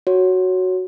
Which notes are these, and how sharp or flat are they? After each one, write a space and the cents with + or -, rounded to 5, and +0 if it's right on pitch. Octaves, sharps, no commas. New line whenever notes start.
F#4 +0 C#5 +0